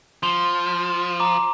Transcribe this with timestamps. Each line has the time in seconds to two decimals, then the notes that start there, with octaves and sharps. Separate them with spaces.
0.23 F3 C6 F7 G7
1.20 A#5 D6